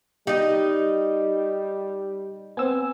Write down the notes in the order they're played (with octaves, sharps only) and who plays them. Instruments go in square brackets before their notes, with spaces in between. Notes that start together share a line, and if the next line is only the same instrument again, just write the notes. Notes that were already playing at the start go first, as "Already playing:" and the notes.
[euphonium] G3 [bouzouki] D#4 D#5 [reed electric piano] G4
[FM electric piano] B3 C4 [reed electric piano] G#5 E6